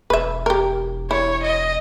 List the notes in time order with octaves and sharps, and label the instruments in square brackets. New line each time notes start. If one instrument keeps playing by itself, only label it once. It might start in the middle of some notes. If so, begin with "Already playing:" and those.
[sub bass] E1 [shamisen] B4 E5
[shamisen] G4 A#4
[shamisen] E4 [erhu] C#5
[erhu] D#5